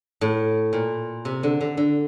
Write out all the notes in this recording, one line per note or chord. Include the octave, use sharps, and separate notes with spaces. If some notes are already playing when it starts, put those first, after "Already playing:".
A2
A#2
C3
D3
D3
D3